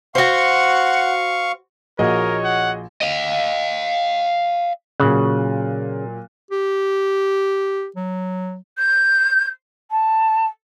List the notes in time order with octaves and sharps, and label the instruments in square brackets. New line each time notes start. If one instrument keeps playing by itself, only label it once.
[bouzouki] F#4 C5 [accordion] F5 C#6 [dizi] F#5
[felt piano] A#1 [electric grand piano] F#4 G#4 D#5 [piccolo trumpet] A#4 [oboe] C#5
[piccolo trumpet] F#5
[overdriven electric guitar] D#5 F5
[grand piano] A#2 F#3 F#6 [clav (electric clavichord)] C#3
[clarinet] G4
F#3
[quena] G6
A5